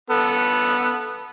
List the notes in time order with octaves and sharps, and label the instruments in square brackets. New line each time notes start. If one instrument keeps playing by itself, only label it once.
[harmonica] B3 A4